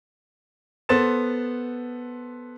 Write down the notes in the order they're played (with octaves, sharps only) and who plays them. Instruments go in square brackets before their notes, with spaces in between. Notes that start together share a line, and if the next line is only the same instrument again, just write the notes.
[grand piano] B3 A4 C5 C6 A6 E7